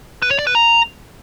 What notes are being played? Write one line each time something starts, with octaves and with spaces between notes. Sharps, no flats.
B4
C#5
D5
B4
A#5